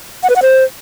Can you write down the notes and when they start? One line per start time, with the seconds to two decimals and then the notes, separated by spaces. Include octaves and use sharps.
0.23 F#5
0.30 B4
0.36 F#5
0.42 C5